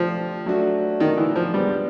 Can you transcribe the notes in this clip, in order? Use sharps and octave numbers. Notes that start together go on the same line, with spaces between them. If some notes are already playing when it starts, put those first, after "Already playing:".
Already playing: F3 A3 D4 G4
F#3 A3 D4 F#4
D#3
E3
F3
G3 G#3 B3 D4